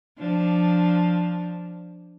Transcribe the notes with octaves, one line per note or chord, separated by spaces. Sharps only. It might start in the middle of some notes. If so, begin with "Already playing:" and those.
F3 D4